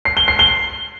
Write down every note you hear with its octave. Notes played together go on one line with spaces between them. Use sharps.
C7
G7
C7
G7